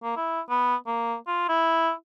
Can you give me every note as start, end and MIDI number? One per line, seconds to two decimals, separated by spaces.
0.03 0.14 58
0.16 0.41 64
0.49 0.75 59
0.87 1.15 58
1.27 1.45 65
1.49 1.90 64